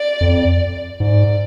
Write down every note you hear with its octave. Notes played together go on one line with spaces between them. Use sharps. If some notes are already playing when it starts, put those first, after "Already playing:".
Already playing: D5
F2
G#2 D5